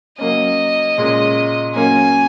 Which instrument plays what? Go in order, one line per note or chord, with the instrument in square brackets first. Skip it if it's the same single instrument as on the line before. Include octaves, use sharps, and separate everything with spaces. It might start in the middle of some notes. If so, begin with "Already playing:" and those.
[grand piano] F#3 A#3 C#4 [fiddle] D#5
[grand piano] A#2 G#3 C#4
[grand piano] F#3 A#3 C#4 [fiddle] G#5